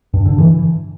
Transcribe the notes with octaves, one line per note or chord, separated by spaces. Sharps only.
G2
D3
E3